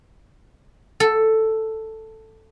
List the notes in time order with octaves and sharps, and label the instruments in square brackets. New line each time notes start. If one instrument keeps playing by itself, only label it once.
[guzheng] A4